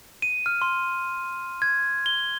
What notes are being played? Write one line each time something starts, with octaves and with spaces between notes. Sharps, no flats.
D#7
F6
C6
G#6
G7